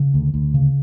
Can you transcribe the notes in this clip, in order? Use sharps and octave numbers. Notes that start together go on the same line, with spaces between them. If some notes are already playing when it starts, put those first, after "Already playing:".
Already playing: C#3
D2
D2
C#3